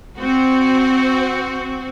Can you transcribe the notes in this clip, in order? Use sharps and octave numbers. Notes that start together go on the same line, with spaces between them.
C4 F#4